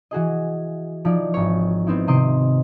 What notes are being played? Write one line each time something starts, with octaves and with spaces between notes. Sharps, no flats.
E3 F#4 G#4 D#5
F3 D#4 E4 D5
G#1 C#5
B3 C4 D#4 E4
C3 D#3 D#5 C6 D7